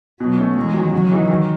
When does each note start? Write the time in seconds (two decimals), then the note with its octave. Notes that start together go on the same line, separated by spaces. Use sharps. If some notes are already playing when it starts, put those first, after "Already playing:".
0.20 B2 F#3
0.38 A3 C#4
0.56 E2 G#3
0.74 D#3 F#3
0.93 C#3 F#3
1.12 E3 G#3 D#4
1.30 D#3